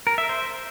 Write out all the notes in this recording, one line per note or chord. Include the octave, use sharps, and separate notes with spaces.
A#4
E5
C5